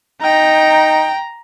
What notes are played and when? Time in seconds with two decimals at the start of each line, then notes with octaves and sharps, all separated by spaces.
0.23 D#4 G5 A#5